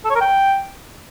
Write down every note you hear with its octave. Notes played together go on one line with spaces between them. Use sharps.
A4
C#5
A#4
G5